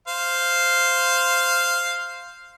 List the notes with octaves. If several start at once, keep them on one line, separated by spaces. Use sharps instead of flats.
C5 F5